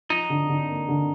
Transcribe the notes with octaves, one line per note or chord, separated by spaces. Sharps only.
F3 D#4
D3
D3
A#3
D3